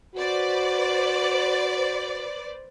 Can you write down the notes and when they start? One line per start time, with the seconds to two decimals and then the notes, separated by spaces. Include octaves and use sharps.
0.16 F#4 B4 C5 D5